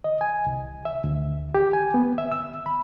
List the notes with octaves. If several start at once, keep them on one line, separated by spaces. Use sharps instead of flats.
D#5
G#5
C2
E5
D2
G4
G#5
B3
E5
E6
B5